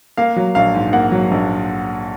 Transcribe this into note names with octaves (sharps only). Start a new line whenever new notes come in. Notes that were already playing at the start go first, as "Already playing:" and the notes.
A#3 F5
F#3
A#1 F5
G#2
A#3 F#5
F#3
A#1